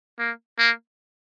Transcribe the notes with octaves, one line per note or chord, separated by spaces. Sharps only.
A#3
A#3